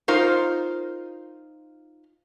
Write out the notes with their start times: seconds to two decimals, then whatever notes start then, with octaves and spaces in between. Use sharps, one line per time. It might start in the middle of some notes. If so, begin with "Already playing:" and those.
0.08 D#4 F4 A#4 C5